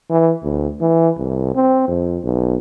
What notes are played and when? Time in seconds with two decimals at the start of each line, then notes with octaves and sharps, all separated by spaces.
0.10 E3
0.43 D2
0.81 E3
1.18 C2
1.55 C4
1.88 F2
2.23 B1